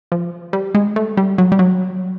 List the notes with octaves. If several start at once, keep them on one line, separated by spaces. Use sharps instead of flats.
F3
G3
G#3
A3
G3
F#3
G3
F#3